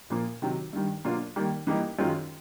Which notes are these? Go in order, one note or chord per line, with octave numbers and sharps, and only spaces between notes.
A#2 F3 A#3
C3 D#3 F#3
G2 D#3 G3
B2 F#3 A#3 D4 F4
D#3 G3 A#3
E3 G3 A#3 D#4 G4
F#2 D#3 G#3 C#4 F4